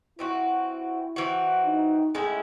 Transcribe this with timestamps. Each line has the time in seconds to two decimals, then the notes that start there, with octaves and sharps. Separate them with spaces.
0.19 E3 C4 E4 F#4
1.16 E3 C4 F#4
1.65 D#4
2.15 A2 G#3 C#4 E4